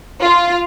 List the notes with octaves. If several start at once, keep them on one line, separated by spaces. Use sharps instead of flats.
F4